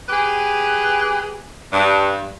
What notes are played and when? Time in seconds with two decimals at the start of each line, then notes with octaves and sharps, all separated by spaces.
0.09 G4 G#4 B4
1.73 G2